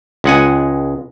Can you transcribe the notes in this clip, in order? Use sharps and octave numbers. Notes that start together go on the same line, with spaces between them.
C#2 G#3 F#5 G#5